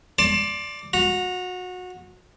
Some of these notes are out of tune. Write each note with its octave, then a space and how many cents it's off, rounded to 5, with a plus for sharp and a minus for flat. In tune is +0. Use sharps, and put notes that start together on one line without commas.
D5 +0 A5 +30 C6 +30
F#4 -25 A#5 +0